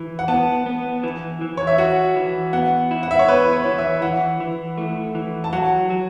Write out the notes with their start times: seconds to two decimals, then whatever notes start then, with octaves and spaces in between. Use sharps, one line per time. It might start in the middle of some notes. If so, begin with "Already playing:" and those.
Already playing: E3
0.19 F#5
0.28 B3 A5
0.66 B3
1.03 E3
1.41 E3
1.57 C#5
1.67 E5
1.78 F#4 F#5
2.16 E3
2.53 B3 F#5
2.91 E4
3.03 F#5
3.11 E5
3.19 C#5
3.28 B3 B4
3.53 C#5
3.65 E3
3.78 E5
4.02 E3 F#5
4.40 E3
4.78 A3
5.15 E3
5.44 A5
5.53 F#3 F#5
5.90 F#3